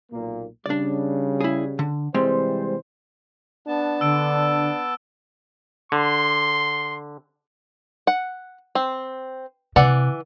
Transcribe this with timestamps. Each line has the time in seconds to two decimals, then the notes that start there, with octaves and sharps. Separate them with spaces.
0.12 B1 A#2 A#3
0.66 C#3 G3 D4 D5
1.41 E4 G#4
1.79 D3
2.14 C3 E3 G3 G#3 C4 C5
3.67 B3 D4 A5
4.01 D3 E6 D7
5.92 D3 C6
8.07 F#5
8.75 C4
9.76 C3 E3 D5 F#5